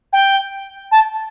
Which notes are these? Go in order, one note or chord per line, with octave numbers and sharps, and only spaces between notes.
G5
A5